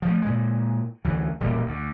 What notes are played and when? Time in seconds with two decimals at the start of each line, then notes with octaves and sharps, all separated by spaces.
0.02 F3 A3
0.22 A#2 G#3
1.05 D2 E3 F#3
1.40 E1 A#2 G3 A#3
1.66 D2